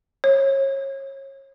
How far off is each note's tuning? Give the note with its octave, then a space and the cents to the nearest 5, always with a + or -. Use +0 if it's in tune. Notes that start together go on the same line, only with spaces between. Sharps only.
C#5 -30